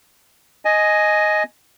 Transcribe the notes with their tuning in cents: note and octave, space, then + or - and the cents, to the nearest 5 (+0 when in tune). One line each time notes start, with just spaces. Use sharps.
D#5 +0 G#5 +10